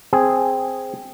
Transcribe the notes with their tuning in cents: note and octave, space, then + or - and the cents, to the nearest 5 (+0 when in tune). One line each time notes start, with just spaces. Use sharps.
C4 +0 G#4 +0